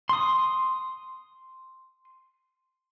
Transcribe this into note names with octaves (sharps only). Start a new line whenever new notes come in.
C6 D#6